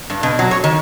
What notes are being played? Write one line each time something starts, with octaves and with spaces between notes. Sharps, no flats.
G2
B2
F#3
C#5
D#3